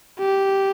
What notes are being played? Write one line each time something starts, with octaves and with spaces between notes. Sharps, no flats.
G4